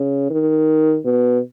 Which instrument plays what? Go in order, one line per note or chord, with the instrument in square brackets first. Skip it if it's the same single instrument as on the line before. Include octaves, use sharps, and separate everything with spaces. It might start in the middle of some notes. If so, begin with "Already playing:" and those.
Already playing: [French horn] C#3
D#3
B2